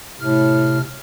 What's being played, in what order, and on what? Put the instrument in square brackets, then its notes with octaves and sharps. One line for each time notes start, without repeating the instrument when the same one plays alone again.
[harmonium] A2 [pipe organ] C3 F6